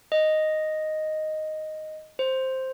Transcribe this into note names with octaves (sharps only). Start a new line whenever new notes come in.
D#5
C5